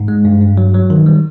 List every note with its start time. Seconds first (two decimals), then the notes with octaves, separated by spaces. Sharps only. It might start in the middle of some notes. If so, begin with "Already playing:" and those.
Already playing: G#2
0.08 G#3
0.25 G2
0.41 G2
0.58 F#3
0.74 F#3
0.90 D#3
1.06 G3